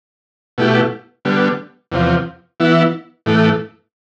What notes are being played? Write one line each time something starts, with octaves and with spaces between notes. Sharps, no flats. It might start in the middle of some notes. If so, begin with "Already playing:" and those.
B2 A3 E4 G4
D3 G3 B3
E2 C3 F3
E3 B3 E4
A2 E3 A3